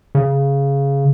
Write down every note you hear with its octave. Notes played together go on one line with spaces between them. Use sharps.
C#3